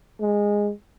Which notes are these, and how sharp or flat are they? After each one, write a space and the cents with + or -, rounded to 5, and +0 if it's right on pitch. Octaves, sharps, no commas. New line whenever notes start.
G#3 -10